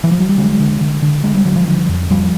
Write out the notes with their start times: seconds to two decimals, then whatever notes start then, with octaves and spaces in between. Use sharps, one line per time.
0.04 E3
0.11 F3
0.20 F#3
0.29 G3
0.38 D3 F#3 G#3
0.60 D3
0.81 D3
1.02 D3
1.24 D3 G#3
1.35 G3
1.45 D3 F#3
1.56 F3 G3
1.67 D3
1.89 F2
2.10 F2 F3 G3